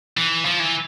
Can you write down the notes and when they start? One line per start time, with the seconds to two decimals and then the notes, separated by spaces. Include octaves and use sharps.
0.17 E3
0.45 F3
0.60 E3